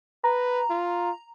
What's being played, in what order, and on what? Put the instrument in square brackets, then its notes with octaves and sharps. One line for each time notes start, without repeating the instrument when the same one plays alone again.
[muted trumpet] B4 [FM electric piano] A#5
[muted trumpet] F4